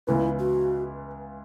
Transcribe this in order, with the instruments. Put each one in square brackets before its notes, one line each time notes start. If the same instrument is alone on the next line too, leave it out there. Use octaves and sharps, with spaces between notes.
[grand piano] C#2 C#3 E3 B3 [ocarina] E4
[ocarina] F#4